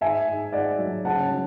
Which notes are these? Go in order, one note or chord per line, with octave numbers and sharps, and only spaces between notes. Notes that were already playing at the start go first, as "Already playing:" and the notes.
G#2 E5 G#5
G#2
G#2 D5 F#5
F#3
C#3 F#5 A5
F#3